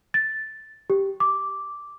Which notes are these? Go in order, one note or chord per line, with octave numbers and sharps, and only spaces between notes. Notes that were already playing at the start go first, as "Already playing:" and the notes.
A6
G4
D6